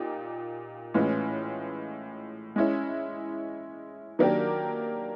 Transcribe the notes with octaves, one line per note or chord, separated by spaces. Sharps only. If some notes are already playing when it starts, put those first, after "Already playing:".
Already playing: A#2 D#4 G4
A2 E3 G#3 C#4 F4
G#3 C#4 E4
D#3 F#3 A#3 D4 G4